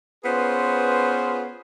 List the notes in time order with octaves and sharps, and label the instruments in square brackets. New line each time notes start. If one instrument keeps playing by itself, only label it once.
[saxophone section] B3 C#4 F4 G#4 B4 C5